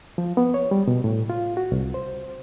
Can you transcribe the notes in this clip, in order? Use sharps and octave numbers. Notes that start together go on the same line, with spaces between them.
F3
B3
C#5
G3
B2
A2
F4
F#4
C2
C5